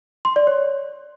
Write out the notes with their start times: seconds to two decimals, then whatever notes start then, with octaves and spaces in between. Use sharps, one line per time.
0.25 C6
0.36 D5
0.47 C#5